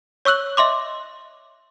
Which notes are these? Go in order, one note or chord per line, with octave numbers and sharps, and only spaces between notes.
C#5 C#6 E6 F#6 F#7
D#5 E5 C6 D6